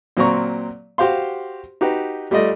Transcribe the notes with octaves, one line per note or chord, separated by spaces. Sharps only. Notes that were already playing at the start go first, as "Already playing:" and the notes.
A#2 F#3 C4 F5 A#5 C#6
F#4 G4 C5 F5 C6
D#4 F#4 G4 B4
G3 A3 F4 D5 D#5